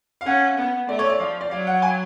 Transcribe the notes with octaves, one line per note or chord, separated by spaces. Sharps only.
F5
C#4 F#5
B3 F#5
A3 D5
C#5
D5
F3 F5
D5
F#3 F5
F#5
G#5